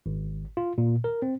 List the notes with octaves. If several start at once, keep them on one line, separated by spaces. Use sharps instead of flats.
G#1
F4
A#2
A#4
C4